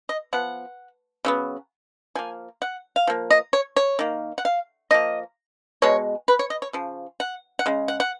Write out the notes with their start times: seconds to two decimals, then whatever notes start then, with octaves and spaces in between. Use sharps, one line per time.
0.09 D#5
0.33 F3 B3 F#5
1.25 C#3 F#3 B3
2.15 F3 A#3 G#5
2.62 F#5
2.96 F5
3.07 F3 A#3
3.30 D#5
3.53 C#5
3.76 C#5
3.99 D#3 A#3
4.38 F#5
4.45 F5
4.91 F3 A#3 D#5
5.82 B2 G#3 C#5
6.28 B4
6.39 C#5
6.50 D#5
6.62 C#5
6.73 C#3 F3
7.20 F#5
7.59 F#5
7.66 C#3 G#3
7.88 F#5
8.00 F#5